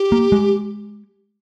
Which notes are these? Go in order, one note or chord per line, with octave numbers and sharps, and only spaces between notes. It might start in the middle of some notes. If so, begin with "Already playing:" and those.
Already playing: G4
A#3
G#3